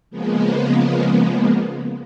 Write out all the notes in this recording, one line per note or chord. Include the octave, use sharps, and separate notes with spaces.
C#3 F3 G#3 A#3 B3